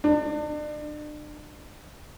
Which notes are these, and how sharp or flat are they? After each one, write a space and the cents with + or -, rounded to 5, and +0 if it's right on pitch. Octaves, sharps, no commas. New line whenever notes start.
D4 +35